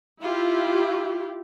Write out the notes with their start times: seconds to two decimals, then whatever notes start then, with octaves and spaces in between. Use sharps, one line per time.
0.22 E4 F4 G4